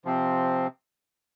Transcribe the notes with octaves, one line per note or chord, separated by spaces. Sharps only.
C3 F3 C4